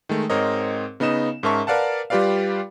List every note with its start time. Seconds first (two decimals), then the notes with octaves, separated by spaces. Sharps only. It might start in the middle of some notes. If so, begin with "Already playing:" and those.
0.09 D#3 G#3 A3
0.30 G#2 C4 A#4 C#5 D#5
1.00 C#3 B3 D#4 D#5 E7
1.43 G#2 C#4 A#4 E5 A5 C#6
1.67 A#4 B4 D5 F5 F#5 A5
2.10 G3 F4 G4 B4 D5 F5